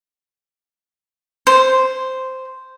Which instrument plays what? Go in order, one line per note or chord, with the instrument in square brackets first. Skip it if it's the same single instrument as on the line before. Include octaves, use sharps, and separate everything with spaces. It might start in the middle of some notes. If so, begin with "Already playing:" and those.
[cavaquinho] C5